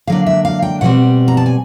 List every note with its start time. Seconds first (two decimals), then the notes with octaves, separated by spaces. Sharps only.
0.07 D3 F#3 A#3 D4 F5
0.26 E5
0.45 F5
0.62 G5
0.81 B2 G3 C4 F#5
1.28 A#5
1.37 A5
1.46 G#5